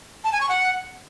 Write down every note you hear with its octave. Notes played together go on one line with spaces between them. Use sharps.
A5
G#5
C#6
F#5